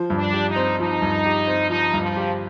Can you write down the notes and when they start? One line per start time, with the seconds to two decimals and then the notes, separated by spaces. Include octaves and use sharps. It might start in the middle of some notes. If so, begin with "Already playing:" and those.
Already playing: F3
0.10 G2
0.18 D4
0.33 G4
0.49 D#4
0.56 C4
0.79 F3 D#4
1.02 G2
1.25 G4
1.47 C4
1.70 F3 D#4
1.94 G2
2.01 F3
2.16 G4